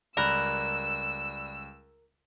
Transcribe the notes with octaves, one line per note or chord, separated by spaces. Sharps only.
C#2 G3 A#4 D5 B5 E6 F#6